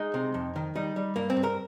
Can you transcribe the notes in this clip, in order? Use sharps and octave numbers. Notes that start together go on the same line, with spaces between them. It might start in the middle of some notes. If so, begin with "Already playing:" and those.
Already playing: G#3 D#4
C3
F2
D#3
G3 D#4
G3
G2 A#3
C4
G2
A#4